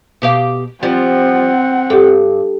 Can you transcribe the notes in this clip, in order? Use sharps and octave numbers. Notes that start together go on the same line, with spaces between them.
B2 G4 F5
F3 G3 C4 F#5
G2 G4 A4